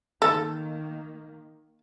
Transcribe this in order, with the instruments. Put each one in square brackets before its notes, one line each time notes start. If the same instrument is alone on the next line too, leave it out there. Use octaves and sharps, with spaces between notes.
[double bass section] D#3 A#3 [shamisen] A4